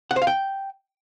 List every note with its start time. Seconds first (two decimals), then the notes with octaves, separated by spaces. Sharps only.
0.11 F#5
0.16 C5
0.22 F5
0.27 G5